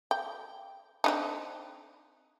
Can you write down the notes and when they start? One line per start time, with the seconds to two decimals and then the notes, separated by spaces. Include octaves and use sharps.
0.11 G5
1.04 C4 D4 D#4